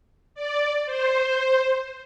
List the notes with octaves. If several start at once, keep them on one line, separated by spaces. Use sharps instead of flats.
D5
C5